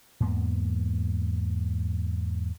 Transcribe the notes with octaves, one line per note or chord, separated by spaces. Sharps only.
E2 G#2 A#3 B3